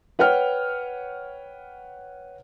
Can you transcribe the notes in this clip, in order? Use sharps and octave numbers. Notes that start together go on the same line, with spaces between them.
B4 C#5 F#5 G5 F6